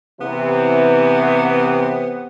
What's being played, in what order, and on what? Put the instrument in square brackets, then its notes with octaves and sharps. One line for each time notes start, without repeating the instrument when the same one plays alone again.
[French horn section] C3 E3 [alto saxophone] B3